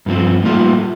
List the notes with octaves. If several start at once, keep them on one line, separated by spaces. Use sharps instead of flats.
G2 F3 C4
A2 G3 A#3 F4